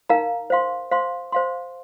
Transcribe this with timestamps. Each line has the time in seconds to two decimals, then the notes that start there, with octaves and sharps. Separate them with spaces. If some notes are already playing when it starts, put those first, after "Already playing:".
0.10 D#4 A#4 F5 A#5
0.50 C5 F5 C6
0.91 C5 F5 C6
1.32 C5 F5 C6